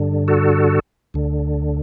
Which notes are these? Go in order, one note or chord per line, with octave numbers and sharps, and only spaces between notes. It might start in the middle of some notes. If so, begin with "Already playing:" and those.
Already playing: G2 D3
F#4 A4
D2 D3